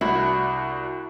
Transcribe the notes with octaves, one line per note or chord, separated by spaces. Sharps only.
C2 D4 E4 F#4